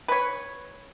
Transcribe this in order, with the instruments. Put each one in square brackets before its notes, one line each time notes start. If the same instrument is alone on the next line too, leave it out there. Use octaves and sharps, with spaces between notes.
[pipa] B4 C#5